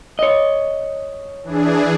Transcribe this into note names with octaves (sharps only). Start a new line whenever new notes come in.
C#5 D#5
E3 D4 G#4